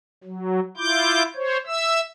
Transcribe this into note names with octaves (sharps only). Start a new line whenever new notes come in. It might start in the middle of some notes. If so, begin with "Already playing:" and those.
F#3
E4 F4 D6 G6
C5 C#5
E5 E6